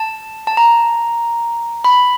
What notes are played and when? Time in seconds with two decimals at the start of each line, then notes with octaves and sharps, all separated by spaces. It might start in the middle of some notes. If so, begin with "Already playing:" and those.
Already playing: A5
0.47 A5
0.57 A#5
1.84 B5